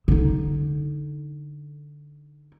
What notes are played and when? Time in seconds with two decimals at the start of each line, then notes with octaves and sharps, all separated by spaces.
0.08 D3 D#4